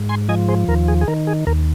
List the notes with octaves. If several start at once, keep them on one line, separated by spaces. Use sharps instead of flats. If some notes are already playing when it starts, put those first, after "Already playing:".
Already playing: G#2
G#5 C6
F3 D#5 G#5
G#4 C5
D#2 A#4
G#4
G#4
D#3 A#4
G#4
D#2 A#4